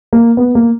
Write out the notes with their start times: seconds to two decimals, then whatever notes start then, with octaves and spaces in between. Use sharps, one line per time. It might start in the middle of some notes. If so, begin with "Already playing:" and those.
0.13 A#3
0.37 B3
0.55 A#3